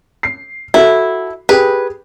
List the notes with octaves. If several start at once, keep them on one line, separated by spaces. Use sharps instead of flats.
C7
E4 F#4 A4
G4 G#4 B4 G5